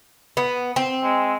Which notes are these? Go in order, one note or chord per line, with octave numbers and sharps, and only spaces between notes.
B3
C4
G#3